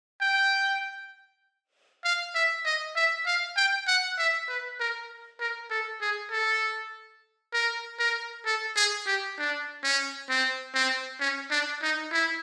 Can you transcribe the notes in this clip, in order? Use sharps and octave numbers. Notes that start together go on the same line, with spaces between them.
G5
F5
E5
D#5
E5
F5
G5
F#5
E5
B4
A#4
A#4
A4
G#4
A4
A#4
A#4
A4
G#4
G4
D4
C#4
C4
C4
C#4
D4
D#4
E4